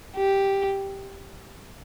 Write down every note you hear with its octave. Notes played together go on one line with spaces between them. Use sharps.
G4